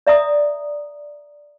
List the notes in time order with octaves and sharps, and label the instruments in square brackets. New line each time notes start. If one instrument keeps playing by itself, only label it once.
[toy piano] D5 E5 A#5 D#6